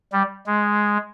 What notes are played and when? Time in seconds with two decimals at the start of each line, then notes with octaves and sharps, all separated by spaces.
0.12 G3
0.46 G#3